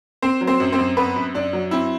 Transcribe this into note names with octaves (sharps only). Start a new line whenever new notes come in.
C4 C5
F#3
C4 C5
F#2
C4 C5
F#2
B3 C4 B4
F#2
F#2 D4
F#3
C4 E4